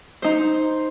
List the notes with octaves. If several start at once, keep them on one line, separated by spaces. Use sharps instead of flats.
D#4 C5